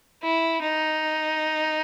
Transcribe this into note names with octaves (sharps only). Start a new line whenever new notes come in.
E4
D#4